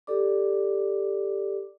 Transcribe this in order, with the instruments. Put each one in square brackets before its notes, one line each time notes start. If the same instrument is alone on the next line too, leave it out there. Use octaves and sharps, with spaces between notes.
[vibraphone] G4 A4 D5 D6